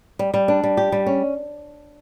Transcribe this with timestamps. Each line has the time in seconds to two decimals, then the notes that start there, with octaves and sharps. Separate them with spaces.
0.19 G3
0.34 G3
0.48 D4
0.63 G3
0.77 G4
0.92 G3
1.06 C#4